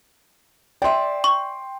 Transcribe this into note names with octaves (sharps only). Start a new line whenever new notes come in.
D5 E5 G5 C6
C#6